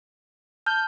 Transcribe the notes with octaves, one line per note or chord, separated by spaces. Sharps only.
A5 F6 G6